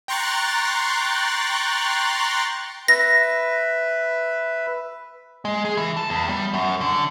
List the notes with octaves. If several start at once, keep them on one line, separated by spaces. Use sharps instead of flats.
G5 A#5 C6 C#6 F#6 A6
B4 E5 A#6
G#3
G#4
E3
A5
E2
G3
F#2
D3